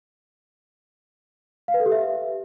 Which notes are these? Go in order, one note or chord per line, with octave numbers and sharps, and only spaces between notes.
F5
B4
A4
G4
E5